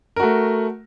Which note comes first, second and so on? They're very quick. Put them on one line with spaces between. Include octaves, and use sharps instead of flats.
A#4 F#4 A3